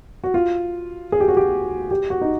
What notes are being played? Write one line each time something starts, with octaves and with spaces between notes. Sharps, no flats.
F#4
F4
G#4
G4
F#4
G4
G4
F#4
D#4